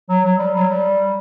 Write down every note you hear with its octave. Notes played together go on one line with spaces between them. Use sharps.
F#3
F#3
G3
F#3
G3